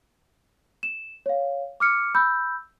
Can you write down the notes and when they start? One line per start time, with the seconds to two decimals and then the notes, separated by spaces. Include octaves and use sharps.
0.83 E7
1.26 C#5 F5
1.80 D6 F6 C#7
2.15 B5 E6 G6